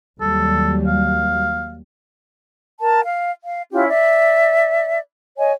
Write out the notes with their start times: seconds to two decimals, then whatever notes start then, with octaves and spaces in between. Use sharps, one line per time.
0.21 D#2 F#3 G3 A4
0.87 F5
2.81 A#4 A5
3.04 F5
3.44 F5
3.72 C#4 E4 F4 G4
3.88 D5 E5
5.38 C#5 D#5 G#5